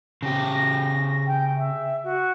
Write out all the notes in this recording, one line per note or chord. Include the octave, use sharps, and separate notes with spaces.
C#3 G4 A#6
G5
E5
F#4